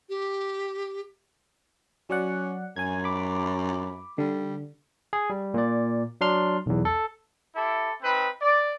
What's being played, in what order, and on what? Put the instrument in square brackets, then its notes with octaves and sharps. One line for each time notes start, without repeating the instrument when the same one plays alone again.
[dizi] G4
[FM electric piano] F#3 D5 F#5 [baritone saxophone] C#4
[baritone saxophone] F#2 [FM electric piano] G#5 G#6
[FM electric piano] B5 D6
[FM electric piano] D3 [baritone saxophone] G3
[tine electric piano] G#4
G3
A#2 D5
F#3 D4 C6 F6
B1 E2
A4
[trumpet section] E4 G4 A4
C4 D#4 B4
D5